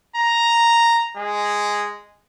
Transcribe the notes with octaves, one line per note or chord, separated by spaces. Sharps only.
A#5
G#3